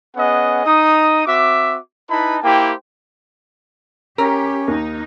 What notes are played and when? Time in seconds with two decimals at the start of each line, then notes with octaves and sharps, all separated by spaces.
0.16 B3 C#4 G#4 D#5 F#5
0.66 D#4 D#6
1.26 C4 F#4 E5 D6
2.10 D#4 E4 B4 A5 B5
2.43 A#3 E4 G4 C5 G5
4.18 C#4 G4 A#4
4.68 D#2 D#4